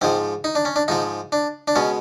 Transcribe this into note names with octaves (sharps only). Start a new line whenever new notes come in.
G#2 F3 G#3 C4
D#4
D4
C#4
D4
G#2 F3 G#3 D#4
D4
D4
B2 G#3 C#4